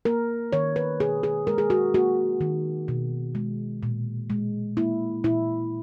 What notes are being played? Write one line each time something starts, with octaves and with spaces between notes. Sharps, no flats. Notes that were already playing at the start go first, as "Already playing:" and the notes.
A#3 A#4
D#3 C#5
B4
B2 G#4
G#4
G#3 A#4
G#4
F#4
A#3 F#4
D#3
B2
G#3
A#2
G#3
A#3 E4
A#2 E4